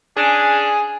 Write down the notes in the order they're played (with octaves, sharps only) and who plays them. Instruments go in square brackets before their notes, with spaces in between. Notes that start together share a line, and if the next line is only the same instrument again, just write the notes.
[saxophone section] C#4 D4 [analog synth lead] G#4